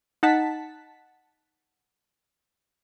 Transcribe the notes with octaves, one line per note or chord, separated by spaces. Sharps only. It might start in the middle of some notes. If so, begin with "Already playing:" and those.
D#4 F#5 A5 B6